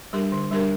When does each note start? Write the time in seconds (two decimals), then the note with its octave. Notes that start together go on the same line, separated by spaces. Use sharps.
0.13 G3 D4 G4 A#4
0.32 D3
0.51 G3 D4 G4 A#4